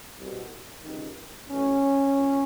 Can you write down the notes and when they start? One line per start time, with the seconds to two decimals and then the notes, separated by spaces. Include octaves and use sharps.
0.19 C2 B2
0.84 C#2 C3 D#3
1.50 B1 A2 E3 C#4
2.16 A#2